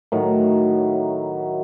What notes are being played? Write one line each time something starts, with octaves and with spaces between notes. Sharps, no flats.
A2 D#3 F#3